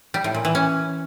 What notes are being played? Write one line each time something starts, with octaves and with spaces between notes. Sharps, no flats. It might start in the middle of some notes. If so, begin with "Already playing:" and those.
G3
A2
A#2
E3
C#4